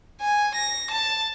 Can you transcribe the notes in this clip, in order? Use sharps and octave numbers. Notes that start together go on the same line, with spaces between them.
G#5
A#6
A5